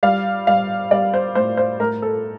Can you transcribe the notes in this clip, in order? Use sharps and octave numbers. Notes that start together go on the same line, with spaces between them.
G3 F5
G3 F5
G3 D5
C5
A2 C5
C5
A2 A#4
A4